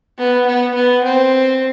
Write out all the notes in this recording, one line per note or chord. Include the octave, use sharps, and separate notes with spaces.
B3
B3
B3
C4